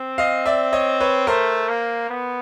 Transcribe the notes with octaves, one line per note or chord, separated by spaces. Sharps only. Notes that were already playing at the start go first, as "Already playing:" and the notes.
Already playing: C4
D#5 F5
D5 E5
C#5 D#5
B4 C#5
A3 A#4 C5
A#3
B3